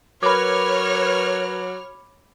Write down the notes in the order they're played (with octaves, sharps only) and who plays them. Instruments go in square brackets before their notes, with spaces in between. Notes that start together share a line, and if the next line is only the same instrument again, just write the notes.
[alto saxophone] F#3 [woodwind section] A#4 B4 [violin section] C#5 F6 [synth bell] B5 D6